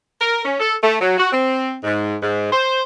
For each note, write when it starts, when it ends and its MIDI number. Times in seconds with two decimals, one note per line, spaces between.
0.20 0.42 70
0.44 0.57 61
0.60 0.75 69
0.82 0.96 57
1.00 1.16 54
1.18 1.28 66
1.32 1.75 60
1.84 2.16 44
2.21 2.50 44
2.51 2.81 72